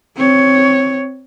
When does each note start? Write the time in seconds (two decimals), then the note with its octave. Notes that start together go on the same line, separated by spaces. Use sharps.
0.17 C4 C#5